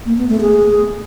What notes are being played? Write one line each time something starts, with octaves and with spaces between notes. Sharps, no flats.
A#3
B3
A3
G#4